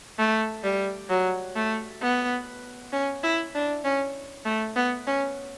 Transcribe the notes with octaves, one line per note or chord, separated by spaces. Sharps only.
A3
G3
F#3
A3
B3
C#4
E4
D4
C#4
A3
B3
C#4